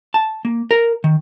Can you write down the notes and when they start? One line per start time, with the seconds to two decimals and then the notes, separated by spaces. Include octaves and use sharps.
0.14 A5
0.45 A#3
0.71 A#4
1.04 D#3